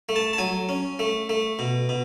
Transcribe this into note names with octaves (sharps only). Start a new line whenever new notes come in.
A3
A5
A5
F#3 G#5
C#4
A3
A3
B2
B2